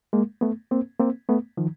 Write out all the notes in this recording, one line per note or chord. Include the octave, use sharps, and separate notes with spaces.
G#3 A#3
A3 B3
A#3 C4
A#3 C4
A3 B3
D#3 F3